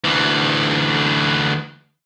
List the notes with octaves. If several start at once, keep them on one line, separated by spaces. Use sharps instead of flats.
D2 E3